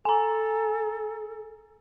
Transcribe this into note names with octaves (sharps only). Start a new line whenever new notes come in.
A4 G#5 A#5